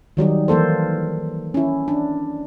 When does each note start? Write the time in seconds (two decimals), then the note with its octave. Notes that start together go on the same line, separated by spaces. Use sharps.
0.17 D#3 F#3 G3 D#4
0.48 E3 A#3 A4 C5
1.54 C#4 E4
1.88 D4